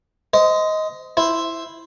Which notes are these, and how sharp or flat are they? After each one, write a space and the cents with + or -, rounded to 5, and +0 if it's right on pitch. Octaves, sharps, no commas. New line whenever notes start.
C5 -20 D#5 +15
E4 +0 C5 +0